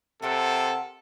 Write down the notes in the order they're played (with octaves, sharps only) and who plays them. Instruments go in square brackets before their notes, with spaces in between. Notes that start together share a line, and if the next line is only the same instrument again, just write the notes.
[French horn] C3 [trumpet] A4 [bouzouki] A#4 F#5 G5